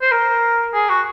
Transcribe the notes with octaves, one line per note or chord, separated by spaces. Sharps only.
C5
A#4
G#4
F#4